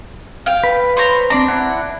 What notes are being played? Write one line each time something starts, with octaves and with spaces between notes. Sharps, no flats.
F5 G5
B4
C5 C#5 A#5
C4 D4 D5 A#5
E4 F#5